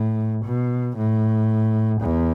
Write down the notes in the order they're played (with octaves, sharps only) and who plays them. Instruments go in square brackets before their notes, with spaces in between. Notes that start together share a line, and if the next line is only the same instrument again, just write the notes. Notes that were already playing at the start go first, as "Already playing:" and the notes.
Already playing: [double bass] A2
B2
A2
E2